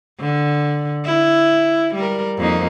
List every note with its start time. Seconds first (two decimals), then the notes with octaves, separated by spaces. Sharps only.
0.20 D3
1.05 E4
1.95 G3 A#4
2.37 F2 A#3 D#4